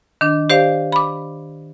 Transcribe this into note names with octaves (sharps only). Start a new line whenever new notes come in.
D#3 D4
G4 C5 D5 F5
B5 D6